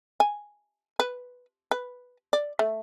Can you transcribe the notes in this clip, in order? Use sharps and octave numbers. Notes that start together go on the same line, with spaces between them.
G#5
B4
B4
D5
A3